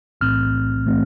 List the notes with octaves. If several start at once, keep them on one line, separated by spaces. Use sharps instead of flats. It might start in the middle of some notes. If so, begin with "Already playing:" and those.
B1 A2 E3 A3 C4 F6
A2 E3 A3 C4